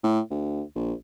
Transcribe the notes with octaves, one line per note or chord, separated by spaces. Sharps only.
A2
D2
A#1